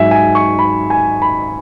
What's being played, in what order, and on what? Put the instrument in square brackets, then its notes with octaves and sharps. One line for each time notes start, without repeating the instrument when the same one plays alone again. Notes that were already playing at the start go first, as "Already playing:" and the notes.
Already playing: [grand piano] G#2 F#3 E5 G#5
G#5
C#6
B5
G#5
B5